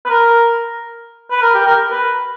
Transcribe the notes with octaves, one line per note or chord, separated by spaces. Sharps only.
B4
A#4
B4
A#4
G4
A#4
B4